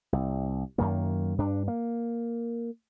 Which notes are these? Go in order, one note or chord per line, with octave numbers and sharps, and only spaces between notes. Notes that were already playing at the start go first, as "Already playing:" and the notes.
C2
F#2 D#3 A#3
G2 D4
A#3